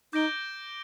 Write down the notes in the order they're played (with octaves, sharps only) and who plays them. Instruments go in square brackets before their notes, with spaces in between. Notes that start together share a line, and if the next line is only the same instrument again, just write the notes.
[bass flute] D#4 [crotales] D6 G6 A#6 D7 G7